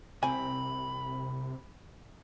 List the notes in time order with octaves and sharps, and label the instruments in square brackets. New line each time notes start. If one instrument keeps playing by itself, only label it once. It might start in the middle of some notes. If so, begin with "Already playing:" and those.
[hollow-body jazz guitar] C2 C4 [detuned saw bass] C3 [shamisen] G#5 [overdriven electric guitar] B5